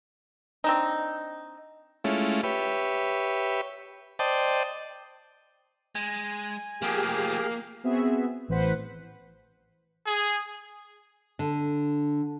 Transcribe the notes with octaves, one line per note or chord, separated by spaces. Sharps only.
C4 D4 D#4
G#3 A3 C#4 E4 F4
G4 B4 C#5 E5
C5 D5 D#5 G5 A5
G#3 G#5
F3 A3 A#3 G4 G#4
B3 C4 F#4 G#4 E5
A1 E3 B4 C5 F#5 B6
G#4
D3